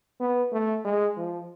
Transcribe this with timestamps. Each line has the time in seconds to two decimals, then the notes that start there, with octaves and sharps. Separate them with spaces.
0.20 B3
0.52 A3
0.85 G#3
1.17 F3